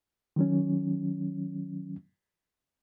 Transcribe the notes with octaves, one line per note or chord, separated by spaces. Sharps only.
D#3 F#3 C#4